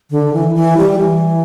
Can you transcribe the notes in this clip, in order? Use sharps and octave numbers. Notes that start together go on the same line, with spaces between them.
D3
E3
E3
G3
E3